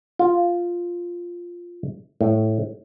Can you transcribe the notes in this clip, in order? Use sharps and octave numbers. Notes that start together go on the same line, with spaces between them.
F4
A2